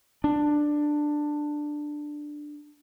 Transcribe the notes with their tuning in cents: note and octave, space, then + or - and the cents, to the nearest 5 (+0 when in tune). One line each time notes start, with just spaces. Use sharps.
D4 +10